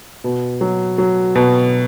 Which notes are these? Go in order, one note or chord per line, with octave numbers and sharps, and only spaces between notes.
B2
F#3
F#3
B2